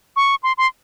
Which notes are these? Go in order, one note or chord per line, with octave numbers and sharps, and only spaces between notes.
C#6
C6
C6